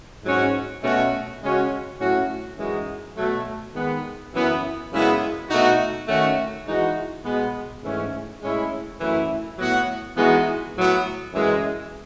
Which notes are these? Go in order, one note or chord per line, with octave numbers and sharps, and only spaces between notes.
G#2 F#3 C#4 F#4
B2 A3 C#4 F#4
C#3 G#3 C#4 F#4
A2 F#3 C#4 F#4
F#2 E3 G#3 D#4 F#4
B2 F#3 A3
D#3 G#3 B3
F#2 E3 B3 E4
F#2 C#3 G#3 B3 E4
B2 A3 D#4 F#4
D#3 A3 C#4 F#4
E3 G#3 D#4 F#4
B2 G#3 B3
G#2 E3 A3 C#4
A2 G#3 C#4 E4
F#2 E3 A3 E4
A2 F#3 B3 F#4
E3 G#3 B3 D#4 F#4
A2 F#3 B3
F#2 E3 G#3